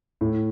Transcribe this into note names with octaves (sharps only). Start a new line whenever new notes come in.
A2